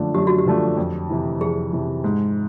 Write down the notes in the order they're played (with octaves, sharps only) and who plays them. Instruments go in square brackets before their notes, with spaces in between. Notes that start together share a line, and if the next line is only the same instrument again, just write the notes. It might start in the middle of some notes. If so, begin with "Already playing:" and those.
Already playing: [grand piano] F#2 D3 F3 A3 D4
[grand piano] F#2 [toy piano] G4
[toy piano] F#4
G4
[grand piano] D3 F3 A3 D4
F2
C3 E3
[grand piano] F2 [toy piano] G#4
[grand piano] C3 E3
G#2